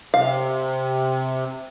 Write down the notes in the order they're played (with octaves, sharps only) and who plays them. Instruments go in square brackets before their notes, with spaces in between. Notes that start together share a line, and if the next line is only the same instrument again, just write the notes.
[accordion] C3 [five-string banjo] F5